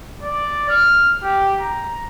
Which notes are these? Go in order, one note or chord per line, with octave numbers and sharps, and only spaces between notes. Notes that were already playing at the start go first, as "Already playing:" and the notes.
D5
F6
G4
A#5